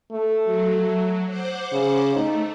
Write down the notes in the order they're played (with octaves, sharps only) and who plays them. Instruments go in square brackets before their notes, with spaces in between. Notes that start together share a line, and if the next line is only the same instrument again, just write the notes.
[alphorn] A3
[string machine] F#3
C5 F#5 D6
[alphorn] C#3
[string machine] A3 [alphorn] D#4